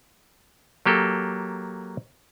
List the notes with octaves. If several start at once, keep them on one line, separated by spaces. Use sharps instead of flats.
F#3 A#3 G4 A4